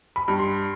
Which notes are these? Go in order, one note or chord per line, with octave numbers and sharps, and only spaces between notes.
B5
G2
C6